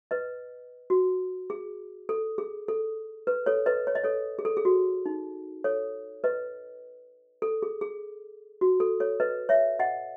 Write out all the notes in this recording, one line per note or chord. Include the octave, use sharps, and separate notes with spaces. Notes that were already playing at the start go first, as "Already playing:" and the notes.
B4 D#5
F#4
G#4
A4
G#4
A4
B4
A4 C#5
B4 D#5
C#5
D#5
A4 C#5
G#4
A4
G#4
F#4
D#4
A4 C#5
B4 D#5
A4
G#4
G#4
F#4
A4
A4 C#5
B4 D#5
C#5 E5
D#5 F#5